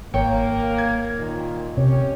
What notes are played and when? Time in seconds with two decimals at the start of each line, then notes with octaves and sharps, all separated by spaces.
0.14 G#1 A#3 C#5 G5
0.78 G#6
1.18 A#2 D#3
1.77 C3 C#4 G4 C#5